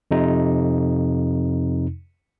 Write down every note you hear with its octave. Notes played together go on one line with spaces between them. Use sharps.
F2 C3 D#4